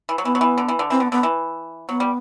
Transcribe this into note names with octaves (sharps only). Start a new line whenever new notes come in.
E3
F#3
E3 B3
F#3
E3
D3
E3
D3
E3 C4
D3 B3
D3 B3
E3
F#3 B3
G3